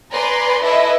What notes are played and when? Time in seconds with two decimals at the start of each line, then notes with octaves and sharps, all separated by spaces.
0.12 B4 D5 G#5 A#5 C6
0.63 E4 A4 B4 D#5 E5